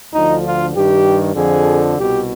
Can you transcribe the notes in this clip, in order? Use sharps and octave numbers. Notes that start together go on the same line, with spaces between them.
D2 D3 F3 D#4
F4
G2 D#3 G4
F2 D3 F3 G#4
C2 B2 G4